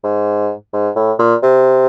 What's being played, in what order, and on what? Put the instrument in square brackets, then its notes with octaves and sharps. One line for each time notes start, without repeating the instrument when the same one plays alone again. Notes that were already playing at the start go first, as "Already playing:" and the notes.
[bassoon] G#2
G#2
A2
A#2
C3